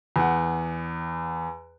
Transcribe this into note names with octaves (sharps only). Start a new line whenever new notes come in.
E2 F#5